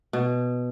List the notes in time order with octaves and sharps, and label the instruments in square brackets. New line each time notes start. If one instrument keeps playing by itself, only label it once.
[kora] B2